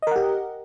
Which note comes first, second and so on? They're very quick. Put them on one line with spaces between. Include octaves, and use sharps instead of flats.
D#5 A#4 F#5 G4